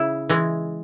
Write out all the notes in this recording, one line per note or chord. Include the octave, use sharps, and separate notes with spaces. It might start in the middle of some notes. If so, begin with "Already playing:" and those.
Already playing: C#3 E4
E3 G#3